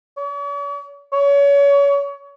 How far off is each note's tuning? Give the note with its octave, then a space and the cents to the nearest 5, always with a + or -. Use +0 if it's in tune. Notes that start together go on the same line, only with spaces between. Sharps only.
C#5 +45
C#5 +30